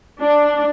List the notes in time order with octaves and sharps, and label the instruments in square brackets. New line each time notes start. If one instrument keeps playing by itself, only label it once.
[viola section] D4